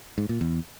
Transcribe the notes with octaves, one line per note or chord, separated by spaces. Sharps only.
G#2
A#2
E2